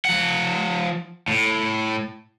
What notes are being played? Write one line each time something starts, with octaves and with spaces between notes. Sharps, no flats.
F3 F#5
A2